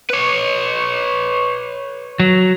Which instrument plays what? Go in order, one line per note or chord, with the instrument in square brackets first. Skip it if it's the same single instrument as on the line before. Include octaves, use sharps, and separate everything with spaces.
[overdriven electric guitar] B4 C#5
[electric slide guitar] F#3